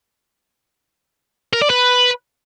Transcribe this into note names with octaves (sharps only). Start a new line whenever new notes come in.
A#4
D5
B4